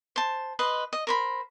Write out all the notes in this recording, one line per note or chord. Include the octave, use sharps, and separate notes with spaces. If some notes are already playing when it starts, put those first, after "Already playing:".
C5 A5
B4 D#5 C6
D#5
A#4 C5 B5